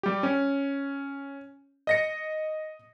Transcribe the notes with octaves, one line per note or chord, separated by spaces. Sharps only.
G3 G4
C#4
D#5 A#6 C#7